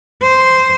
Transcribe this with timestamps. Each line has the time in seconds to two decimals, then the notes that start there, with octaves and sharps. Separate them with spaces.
0.22 C5